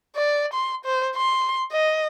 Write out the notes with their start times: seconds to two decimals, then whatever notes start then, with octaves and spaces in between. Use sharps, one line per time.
0.16 D5
0.54 C6
0.85 C5
1.16 C6
1.73 D#5